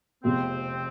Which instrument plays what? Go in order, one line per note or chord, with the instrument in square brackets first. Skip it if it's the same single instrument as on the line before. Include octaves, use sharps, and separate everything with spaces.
[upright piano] F1 E2 C3 F3 [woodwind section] C4